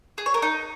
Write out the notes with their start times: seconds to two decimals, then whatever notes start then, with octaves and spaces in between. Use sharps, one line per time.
0.18 G#4
0.26 C#5
0.34 A#4
0.42 D#4